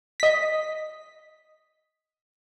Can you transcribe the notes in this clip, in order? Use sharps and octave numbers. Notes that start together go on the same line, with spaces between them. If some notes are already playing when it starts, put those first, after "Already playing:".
D#5 B6